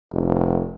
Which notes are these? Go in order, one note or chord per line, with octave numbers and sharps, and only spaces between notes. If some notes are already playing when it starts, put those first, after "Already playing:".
F1